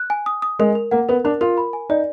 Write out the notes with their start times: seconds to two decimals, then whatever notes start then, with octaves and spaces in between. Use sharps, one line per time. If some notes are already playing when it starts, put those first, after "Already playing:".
Already playing: F#6
0.10 G#5
0.26 D#6
0.42 D#6
0.59 G#3 A#4
0.75 A#4
0.91 A#3 F#5
1.09 B3 A#4
1.25 D4 A#4
1.41 F4 A#4
1.58 B5
1.73 G#5
1.89 D#4 D5